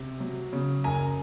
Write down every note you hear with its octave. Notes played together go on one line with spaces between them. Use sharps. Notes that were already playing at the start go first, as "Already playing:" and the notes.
Already playing: C3
F#3
C#3
F#1 G#5 A#5